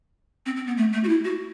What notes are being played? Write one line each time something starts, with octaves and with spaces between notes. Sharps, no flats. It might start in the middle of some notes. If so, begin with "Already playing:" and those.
C4
C4
B3
A3
A3
F#4
E4
F#4